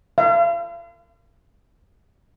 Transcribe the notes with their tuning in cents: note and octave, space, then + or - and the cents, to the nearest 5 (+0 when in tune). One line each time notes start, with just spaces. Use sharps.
F5 -40